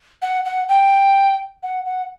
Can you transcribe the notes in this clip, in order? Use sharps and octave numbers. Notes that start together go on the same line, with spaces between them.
F#5
F#5
G5
F#5
F#5